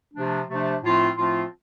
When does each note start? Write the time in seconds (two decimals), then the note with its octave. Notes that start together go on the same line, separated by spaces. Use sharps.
0.13 C3 F3 A3 D4
0.48 C3 F3 A3 D4
0.82 A2 F3 A3 C4 F4
1.16 A2 F3 A3 C4 F4